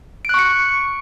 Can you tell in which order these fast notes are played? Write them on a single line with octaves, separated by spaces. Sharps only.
D7 F#6 C#6 C#7